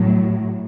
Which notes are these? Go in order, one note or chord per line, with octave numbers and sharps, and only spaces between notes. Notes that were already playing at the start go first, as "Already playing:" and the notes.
Already playing: A2 F#3